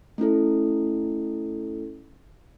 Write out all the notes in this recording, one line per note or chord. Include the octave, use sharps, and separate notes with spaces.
A3 C#4 E4 A4